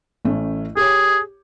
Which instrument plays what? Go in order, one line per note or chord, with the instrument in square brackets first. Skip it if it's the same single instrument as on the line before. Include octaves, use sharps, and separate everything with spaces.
[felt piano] A1 A3 C#4
[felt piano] G4 C#5 [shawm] G#4